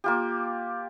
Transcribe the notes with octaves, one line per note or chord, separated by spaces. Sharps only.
A#3 F4 G4